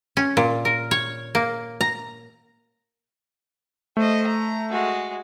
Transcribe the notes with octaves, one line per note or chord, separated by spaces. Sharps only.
C#4
A#2
A#4
C#5
A#3
A#5
A3 C5 D#5
A#5
G#3 F#4